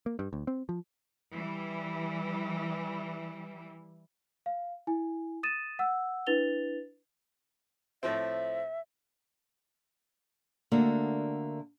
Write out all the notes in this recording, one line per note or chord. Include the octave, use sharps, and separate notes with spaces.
A#3
G2
D2
C4
F3
E3 G3
F5
E4 G#5
D#6 A6 D#7 E7
F#5 E6
D4 E4 B4 A6 F7 G7
A2 F3 C4 E5
D3 A3 A#3 D4 F#4